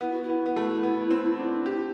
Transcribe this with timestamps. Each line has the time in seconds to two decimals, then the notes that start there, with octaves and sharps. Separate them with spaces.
0.01 B3 E4
0.11 F#4
0.23 E4
0.29 B3
0.46 B3
0.56 A3
0.83 B3
1.11 C4
1.39 D4
1.66 G4